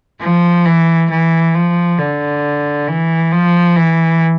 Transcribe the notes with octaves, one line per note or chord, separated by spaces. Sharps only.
F3
E3
E3
F3
D3
E3
F3
E3